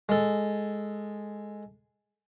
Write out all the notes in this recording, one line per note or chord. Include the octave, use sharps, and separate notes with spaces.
G#3 A4